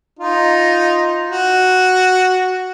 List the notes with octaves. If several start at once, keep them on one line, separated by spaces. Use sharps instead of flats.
D#4 F4
F#4